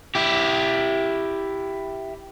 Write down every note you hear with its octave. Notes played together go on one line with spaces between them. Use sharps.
E4 G4